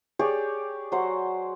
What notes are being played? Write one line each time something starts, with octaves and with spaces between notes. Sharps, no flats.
G4 G#4 C#5 D5
F#3 C5 F#5